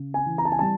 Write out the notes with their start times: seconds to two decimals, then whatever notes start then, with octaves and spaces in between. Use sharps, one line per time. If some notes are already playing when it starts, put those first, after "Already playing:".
Already playing: C#3
0.14 G#5
0.26 E3
0.38 A#5
0.45 A5
0.52 G#5
0.59 G3 A5